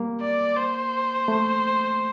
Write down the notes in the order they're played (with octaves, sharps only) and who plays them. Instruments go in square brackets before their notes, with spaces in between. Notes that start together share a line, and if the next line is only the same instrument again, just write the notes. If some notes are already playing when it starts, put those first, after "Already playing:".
Already playing: [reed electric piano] G3 A#3
[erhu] D5
C5
[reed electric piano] A3